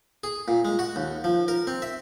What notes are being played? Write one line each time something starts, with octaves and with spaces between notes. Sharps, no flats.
G#4
A#2
G#3
F#4
D#2
F3
A#4
C4
E5